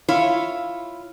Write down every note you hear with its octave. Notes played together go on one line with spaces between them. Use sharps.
E4 F4 C#5 F5